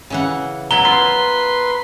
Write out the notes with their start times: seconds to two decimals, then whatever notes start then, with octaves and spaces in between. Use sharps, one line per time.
0.10 C#3 E3 F#5
0.71 F#3 B3 E4 A#5 G7
0.85 F4 B4 C6